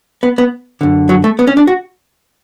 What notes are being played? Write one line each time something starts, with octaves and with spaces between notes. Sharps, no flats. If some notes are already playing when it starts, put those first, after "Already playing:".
B3
B3
F#2 D3
F#3
A3
B3
C#4
D4
F#4